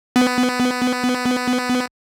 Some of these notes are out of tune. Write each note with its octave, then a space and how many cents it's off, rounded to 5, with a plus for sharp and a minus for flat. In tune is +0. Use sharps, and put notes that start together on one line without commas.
B3 +15